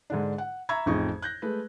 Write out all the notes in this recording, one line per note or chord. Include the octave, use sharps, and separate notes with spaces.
G#2 D3 D4
F#5
E5 A#5 B5 C#6 E6 G#6
A1 F2 D#4 G#4 C#6
F#6 G6 A#6
G#3 A3 B4